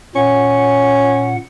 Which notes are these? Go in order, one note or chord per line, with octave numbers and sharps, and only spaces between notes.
A#2 C#4 F#5